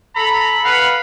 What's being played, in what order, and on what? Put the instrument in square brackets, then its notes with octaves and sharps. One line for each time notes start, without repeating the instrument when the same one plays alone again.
[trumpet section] A4 A#5 B5
B4 F5 F#5 B5